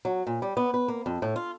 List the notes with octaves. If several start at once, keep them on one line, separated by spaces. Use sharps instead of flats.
F#3
A#2
G3
B3
B4
A#3
F2
A2
F4